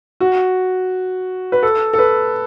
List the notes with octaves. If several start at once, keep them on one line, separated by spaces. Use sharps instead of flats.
F#4
B4
A4
A4
B4